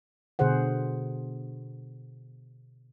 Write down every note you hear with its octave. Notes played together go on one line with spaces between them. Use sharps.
B2 D3 G#4 C5 F#5